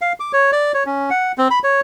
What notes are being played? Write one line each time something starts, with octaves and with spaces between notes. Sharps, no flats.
F5
D6
C#5
D5
C#5
C#4
F#5
C4
B5
C#5